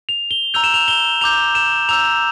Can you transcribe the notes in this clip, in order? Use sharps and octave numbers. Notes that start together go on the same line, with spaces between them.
F7
G7
A#5 E6 G6 F7
E7
F7
G7
A#5 D6 G6 F7
E7
A#5 E6 G6 F7